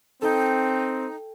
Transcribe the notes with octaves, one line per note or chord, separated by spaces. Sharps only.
C4 D#4 A4 G5